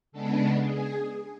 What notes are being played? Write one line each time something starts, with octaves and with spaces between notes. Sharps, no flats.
C#3 G#3 B3 D4 A4
G#4